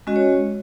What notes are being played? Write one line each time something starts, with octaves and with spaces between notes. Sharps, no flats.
G#3 C#4 F#4 D#5
C#5